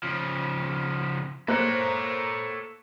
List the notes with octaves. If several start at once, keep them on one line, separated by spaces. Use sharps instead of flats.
C#3 F3
A#3 A4 C5 C#5 F#6